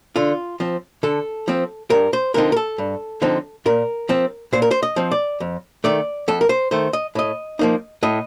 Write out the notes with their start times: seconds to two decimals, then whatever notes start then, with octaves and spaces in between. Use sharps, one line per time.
0.16 D3 F4
0.60 F3 C4
1.03 D3 A4
1.48 F3 C4
1.90 G2 A#4
2.13 C5
2.34 D3 F3 C4 D#4 A#4
2.52 A#4
2.56 A4
2.78 G2
3.22 D3 F3 C4 D#4
3.66 A#2 A#4
4.09 F3 C4
4.53 A#2 C5
4.62 A#4
4.71 C5
4.83 D#5
4.96 F3 C4
5.11 D5
5.40 F2
5.84 D#3 A3 D5
6.28 F2 A4
6.41 A#4
6.49 C5
6.71 D#3 A3 C5
6.93 D#5
7.15 A2 D#5
7.59 F3 A#3 D#4
8.03 A2 D#5